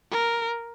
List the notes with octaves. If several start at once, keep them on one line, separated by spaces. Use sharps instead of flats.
A#4